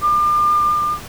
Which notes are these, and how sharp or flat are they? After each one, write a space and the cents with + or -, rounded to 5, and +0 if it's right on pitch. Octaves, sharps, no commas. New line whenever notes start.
D6 +35